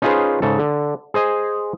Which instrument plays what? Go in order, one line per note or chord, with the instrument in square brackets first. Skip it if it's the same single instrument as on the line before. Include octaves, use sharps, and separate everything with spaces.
[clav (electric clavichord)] C#4 D#4 F4 G#4 B4 C5
G#2 C#3 A4
D3
G#4 C5 D#5 G#5